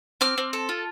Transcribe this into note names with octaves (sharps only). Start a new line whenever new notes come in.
C4 D6 F6
C4
A4
F4